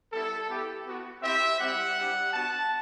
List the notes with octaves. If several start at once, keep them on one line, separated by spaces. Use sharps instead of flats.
G3 B3 E4 A4
B3 E4 G4
B3 F#4
C4 E4 G4 E5
G3 C4 E4 G4 F#5
G3 D4 G4
B3 D4 F#4 A5